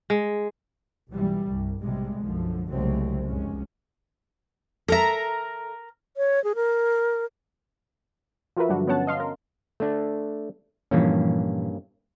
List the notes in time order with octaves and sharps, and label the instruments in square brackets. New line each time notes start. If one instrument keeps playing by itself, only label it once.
[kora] G#3
[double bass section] B1 E3 G3
C2 G2
B1 A2 C3 G3 G#3
B1 F#2 D3 F3
C2 C#3 F#3 G#3 A3 C4
F1 C#2 F#2 G#3 C#4
[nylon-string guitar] A4 E5 [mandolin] A#4 A#5
[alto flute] C#5
G#4
A#4
[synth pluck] F3 F4 F#4 A#4 B4 E5
G2 D3 F#3 G3 D4 F#4
B3 C#4 C#5 F#5 A5
D#5 F5 C6
A#4
[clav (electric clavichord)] A3 D4
[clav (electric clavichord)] G2 A#3 C#4 [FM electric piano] A#2 E3 F3